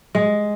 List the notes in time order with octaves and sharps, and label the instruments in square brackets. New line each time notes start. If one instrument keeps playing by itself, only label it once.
[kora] G#3